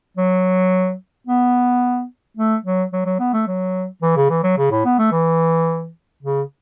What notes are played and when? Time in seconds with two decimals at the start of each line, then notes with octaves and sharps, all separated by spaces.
0.17 F#3
1.27 B3
2.37 A3
2.65 F#3
2.93 F#3
3.06 F#3
3.20 B3
3.33 A3
3.47 F#3
4.02 E3
4.16 C#3
4.30 E3
4.43 F#3
4.58 C#3
4.71 A2
4.85 B3
4.99 A3
5.12 E3
6.23 C#3